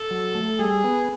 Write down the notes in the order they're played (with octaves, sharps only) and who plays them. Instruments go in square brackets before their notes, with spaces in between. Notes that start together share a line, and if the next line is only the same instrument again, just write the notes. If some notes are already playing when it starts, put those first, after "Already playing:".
Already playing: [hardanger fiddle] A4
[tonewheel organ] F#3
A3
[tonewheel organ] G3 [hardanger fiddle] G#4
[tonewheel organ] B3